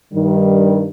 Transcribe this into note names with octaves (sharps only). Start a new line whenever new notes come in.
G2 D#3 G3